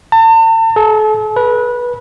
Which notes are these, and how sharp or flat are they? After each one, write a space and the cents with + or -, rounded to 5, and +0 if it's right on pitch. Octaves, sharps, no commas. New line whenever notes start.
A5 +40
A4 -40
B4 -20